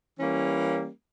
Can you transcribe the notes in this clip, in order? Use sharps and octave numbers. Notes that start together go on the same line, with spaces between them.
E3 G3 A#3 C#4